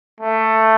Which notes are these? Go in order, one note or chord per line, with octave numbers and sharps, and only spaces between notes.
A3